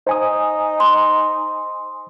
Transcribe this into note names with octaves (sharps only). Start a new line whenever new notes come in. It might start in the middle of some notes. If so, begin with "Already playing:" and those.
D#4 C5 G#5 D#6
C6